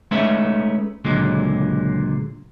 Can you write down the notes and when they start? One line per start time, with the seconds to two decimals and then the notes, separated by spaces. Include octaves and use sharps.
0.11 G#3 A3 C#4 D#4 B4 E5
1.05 C#2 A#2 D3 F#3 G#3